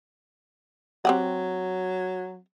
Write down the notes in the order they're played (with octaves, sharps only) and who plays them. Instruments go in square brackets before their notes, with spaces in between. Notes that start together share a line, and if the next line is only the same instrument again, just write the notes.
[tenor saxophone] F#3 [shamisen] C4 G4 F#5